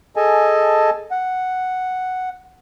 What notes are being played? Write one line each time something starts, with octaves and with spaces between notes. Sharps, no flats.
G#4 A4 D#5 G#5 A5
F#5